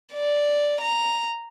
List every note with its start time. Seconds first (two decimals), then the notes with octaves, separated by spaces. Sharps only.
0.13 D5
0.81 A#5